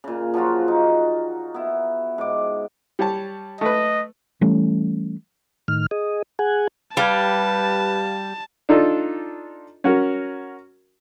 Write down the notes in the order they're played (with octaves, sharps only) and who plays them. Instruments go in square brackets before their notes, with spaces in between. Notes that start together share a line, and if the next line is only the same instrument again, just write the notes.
[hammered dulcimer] A#2 C#3
F3 F#3 F4 F#4
D#4
B3 E4
G#2 D6
[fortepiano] G3 C#5 A5
[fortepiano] A3 B4 [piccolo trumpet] D#5
[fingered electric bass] E3 G3 A3 C#4
[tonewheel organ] A2 D#3 F6
G#4 D#5
G#4 F#5 G#5
[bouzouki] G3 [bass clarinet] B4 [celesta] F5 F6 G#6 [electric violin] A5
[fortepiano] D4 D#4 F4 A4
C#4 F#4 A#4